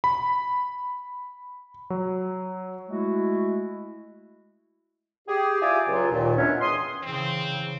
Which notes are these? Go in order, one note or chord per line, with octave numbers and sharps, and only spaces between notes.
B5
F#3
G#3 A3 E4 F#4
G4 G#4
E4 F4 G4 D5 G#5
C#2 F#3 F4
D#2 A#2 D#3
B2 F#3 C#4 D4 C#5 E5
E2 C6 D#6
C#3 E3 C4